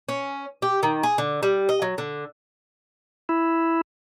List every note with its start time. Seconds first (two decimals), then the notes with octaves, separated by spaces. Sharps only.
0.09 C#4
0.62 G4
0.83 D#3
1.03 G#4
1.18 D3
1.43 G3
1.69 D#5
1.82 F#3
1.98 D3
3.29 E4